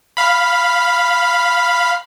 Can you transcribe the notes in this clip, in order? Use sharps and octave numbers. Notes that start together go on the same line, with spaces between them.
F5 B5